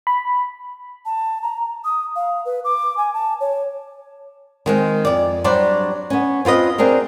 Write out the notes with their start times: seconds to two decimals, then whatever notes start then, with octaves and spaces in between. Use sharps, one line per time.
0.07 B5
1.06 A5
1.42 A#5
1.85 D#6
2.16 F5
2.45 B4
2.64 D6
2.97 G#5
3.14 A5
3.40 C#5
4.66 D#3 G#3 C4
5.05 F2 D5
5.44 F#3 G3 D4 C5 D5
6.10 B3 C#4
6.45 C4 F4 B4 D#5
6.78 C4 D4 G#4 A#4